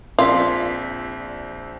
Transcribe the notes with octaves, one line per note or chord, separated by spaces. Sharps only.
A#1 C4 F4 D5 B6